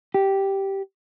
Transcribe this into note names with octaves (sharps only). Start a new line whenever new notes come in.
G4